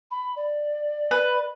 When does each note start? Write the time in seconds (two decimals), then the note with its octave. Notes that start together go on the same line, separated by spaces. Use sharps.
0.11 B5
0.36 D5
1.11 B4